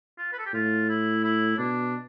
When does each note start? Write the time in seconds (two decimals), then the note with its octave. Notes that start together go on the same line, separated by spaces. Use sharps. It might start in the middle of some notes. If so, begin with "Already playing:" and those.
0.18 F4
0.33 B4
0.39 A4
0.46 G4
0.53 A2 F4
0.89 E4
1.24 E4
1.58 B2 D4